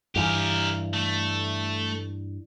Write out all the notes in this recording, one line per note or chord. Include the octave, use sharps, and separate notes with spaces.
G2 E3 G4 A#4
A3